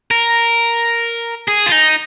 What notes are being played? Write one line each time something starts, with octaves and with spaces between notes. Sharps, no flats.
A#4
G#4
F4
D#4